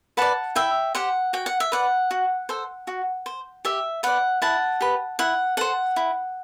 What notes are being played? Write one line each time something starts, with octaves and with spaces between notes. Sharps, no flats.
B4 D5 F#5 A5
E4 E5 G5
G4 C5 F#5
F#4 G5
F#5
E5
B4 D5 F#5
F#4
A4 C5
F#4
C5
G4 E5
B4 D5 F#5
E4 F#5 A5
G4 B4
E4 F#5
A4 C5 F#5
E4